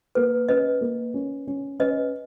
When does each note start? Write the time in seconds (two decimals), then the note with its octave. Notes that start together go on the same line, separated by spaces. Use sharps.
0.15 A#3 B4
0.49 C#4 B4 D#5
0.81 A#3
1.14 C#4
1.47 C#4
1.79 C#4 B4 D#5